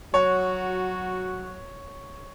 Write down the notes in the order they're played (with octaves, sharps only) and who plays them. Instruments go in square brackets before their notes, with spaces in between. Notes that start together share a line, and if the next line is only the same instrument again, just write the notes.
[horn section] F#3 F#4 [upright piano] C#5